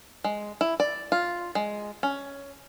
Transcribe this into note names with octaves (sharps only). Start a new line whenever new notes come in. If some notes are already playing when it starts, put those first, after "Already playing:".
G#3
E4
D5
F4
G#3
C#4